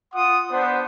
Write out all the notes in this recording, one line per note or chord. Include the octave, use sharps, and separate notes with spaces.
F4 F#5 C6 D#6
B3 D4 C5